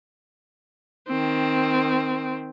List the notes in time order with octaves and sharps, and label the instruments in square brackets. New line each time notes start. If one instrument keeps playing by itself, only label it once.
[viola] D#3 C4